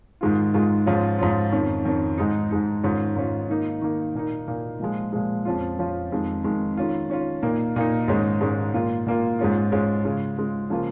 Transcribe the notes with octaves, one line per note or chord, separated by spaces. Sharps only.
G#2 D#3 G#3 F4
G#2 D#3 G#3 F4
G#2 F3 C#4 F4
G#2 F3 C#4 F4
F2 D#3 C#4
F2 D#3 C#4
G#2 G#3 D#4
G#2 G#3 D#4
G#2 D#3 C#4 F4
G#2 D#3 C#4 F4
D#3 A#3 D#4
D#3 A#3 D#4
A#2 A#3 D#4
A#2 A#3 D#4
A#2 F3 G#3
A#2 F3 G#3
F2 F3 C#4 F4
F2 F3 C#4 F4
F2 D#3 G#3
F2 D#3 G#3
D#3 C#4 F4
D#3 C#4 F4
A#2 A#3 D#4
A#2 A#3 D#4
G#2 D#3 G#3 C#4
G#2 D#3 G#3 C#4
A#2 A#3 F4
A#2 A#3 F4
G#2 G#3 C#4 F4
G#2 G#3 C#4 F4
C#3 G#3 F4
C#3 G#3 F4
C#3 F3 A#3 F4